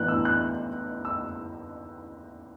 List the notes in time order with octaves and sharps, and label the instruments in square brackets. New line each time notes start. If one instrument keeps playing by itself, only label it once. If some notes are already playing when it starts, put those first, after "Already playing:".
Already playing: [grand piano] A2 E3 B3 D4 F#6
E6
F#6
E6